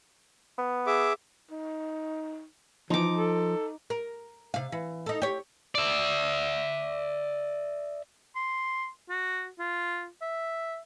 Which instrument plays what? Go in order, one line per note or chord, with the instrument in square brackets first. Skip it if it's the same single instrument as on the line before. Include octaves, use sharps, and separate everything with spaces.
[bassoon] B3
[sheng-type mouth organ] G#4 E5 D6
[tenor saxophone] D#4
[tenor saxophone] E3 [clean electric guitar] F3 [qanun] D#4 D6
[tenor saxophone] A4
[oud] A#4
C3 F5
E3
D#4 A4
G4 C#5
[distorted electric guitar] D5 E5
[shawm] C6
F#4
F4
E5